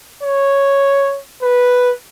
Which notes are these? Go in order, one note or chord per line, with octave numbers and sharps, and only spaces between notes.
C#5
B4